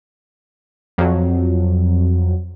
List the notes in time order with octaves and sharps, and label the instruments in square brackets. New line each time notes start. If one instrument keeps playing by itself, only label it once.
[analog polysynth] F2 F#3